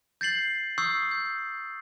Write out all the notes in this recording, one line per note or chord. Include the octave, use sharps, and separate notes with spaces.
G6 A6 C7 F#7
C#6 D#6 E6 G6 C7
G6